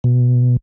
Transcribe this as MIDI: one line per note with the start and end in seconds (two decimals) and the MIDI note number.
0.04 0.57 47